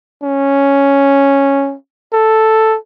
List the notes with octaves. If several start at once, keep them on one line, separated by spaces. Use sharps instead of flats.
C#4
A4